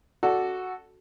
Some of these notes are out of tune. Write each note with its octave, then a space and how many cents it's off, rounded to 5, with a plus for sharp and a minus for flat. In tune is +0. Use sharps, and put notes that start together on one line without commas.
F#4 +0 A4 +0 D5 +0